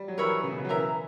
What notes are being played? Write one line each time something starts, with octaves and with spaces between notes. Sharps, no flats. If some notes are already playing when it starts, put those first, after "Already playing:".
Already playing: G3
F#3
E3 A#4 C#5 E5 B5
C#3
B2
C#3
F#3
E3 A#4 E5 A#5